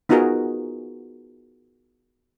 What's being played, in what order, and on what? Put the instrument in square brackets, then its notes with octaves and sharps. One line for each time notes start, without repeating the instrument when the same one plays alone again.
[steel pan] B3 D#4 F4 F#4 G#4 A#4